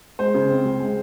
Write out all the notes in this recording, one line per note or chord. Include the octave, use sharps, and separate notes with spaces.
G#3 C5
C#3
C4
C#2
G#3